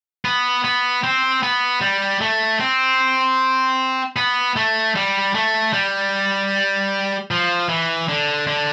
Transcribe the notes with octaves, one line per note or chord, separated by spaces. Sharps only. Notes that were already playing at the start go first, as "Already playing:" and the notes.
B3
B3
C4
B3
G3
A3
C4
B3
A3
G3
A3
G3
F3
E3
D3
D3